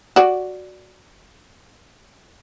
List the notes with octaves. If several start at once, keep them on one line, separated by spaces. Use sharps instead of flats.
F#4 D5